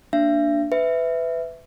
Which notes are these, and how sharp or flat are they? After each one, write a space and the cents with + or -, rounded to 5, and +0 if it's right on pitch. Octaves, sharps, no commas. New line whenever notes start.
A#3 +0 D4 +0 E5 +40
B4 +25 E5 +0